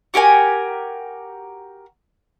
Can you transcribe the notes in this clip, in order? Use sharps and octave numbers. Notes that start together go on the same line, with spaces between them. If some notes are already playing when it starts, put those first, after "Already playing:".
F#4 G4 A#4 G#5